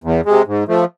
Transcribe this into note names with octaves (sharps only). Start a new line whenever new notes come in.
E2
C3 G#3
G#2
F3 A3